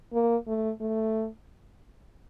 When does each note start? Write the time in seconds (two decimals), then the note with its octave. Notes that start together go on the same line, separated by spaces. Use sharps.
0.13 A#3
0.47 A3
0.81 A3